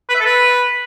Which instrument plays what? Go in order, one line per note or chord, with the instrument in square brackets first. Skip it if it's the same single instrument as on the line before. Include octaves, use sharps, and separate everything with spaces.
[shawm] B4
E5
A4
B4